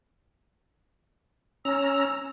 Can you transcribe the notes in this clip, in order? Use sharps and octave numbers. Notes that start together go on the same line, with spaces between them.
C#4 A#5 E6